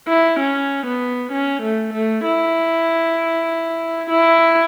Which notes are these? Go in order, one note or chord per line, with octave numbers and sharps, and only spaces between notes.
E4
C#4
B3
C#4
A3
A3
E4
E4